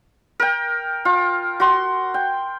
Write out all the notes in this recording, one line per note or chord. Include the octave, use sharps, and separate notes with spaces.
A#4 G5
F4
F#4 C6
G5